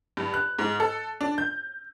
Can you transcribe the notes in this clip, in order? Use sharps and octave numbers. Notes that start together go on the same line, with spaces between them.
G2
F#6
G#2
A4
D4
G6